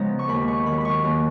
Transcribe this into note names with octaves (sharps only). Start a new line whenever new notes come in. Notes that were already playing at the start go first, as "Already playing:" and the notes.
Already playing: C#3 F3 G#3 B3 A#5
C#6
D#2 B5
C#6
D#3 F#3 B5
B5 C#6
D#2